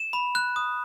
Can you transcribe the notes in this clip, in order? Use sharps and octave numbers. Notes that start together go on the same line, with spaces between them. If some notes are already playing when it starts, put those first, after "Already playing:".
Already playing: E7
B5
F#6
D#6